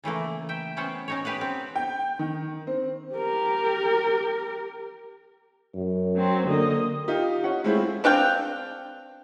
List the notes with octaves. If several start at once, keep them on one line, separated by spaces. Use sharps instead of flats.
C#3 E3 A3 A#3
E5 G5
B3 C#4 C5 F#5 G5
C#4 D#4 C#5
G4 B4 F5 F#5
C4
G5
D#3
C4
G4 A#4
F#2
F#3 C4
D3 A#3 D#5
D#4 F4 G4
C#4 D#4 F#5
G#3 A3 C4 E4 F4 G#4
C4 D4 F5 G5